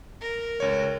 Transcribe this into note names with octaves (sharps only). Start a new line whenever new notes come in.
A#4
C#2 C#5